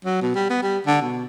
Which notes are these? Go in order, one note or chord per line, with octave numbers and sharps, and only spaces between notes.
F#3
B2
G3
B3
G3
D3
B2